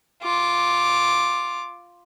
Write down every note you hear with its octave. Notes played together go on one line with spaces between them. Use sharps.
F4 D6